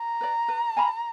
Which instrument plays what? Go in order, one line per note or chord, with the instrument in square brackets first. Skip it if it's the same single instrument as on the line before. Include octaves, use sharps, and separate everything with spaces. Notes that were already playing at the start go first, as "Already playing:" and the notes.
Already playing: [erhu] A#5
[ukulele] B4 D5
B4
F5 G#5 B5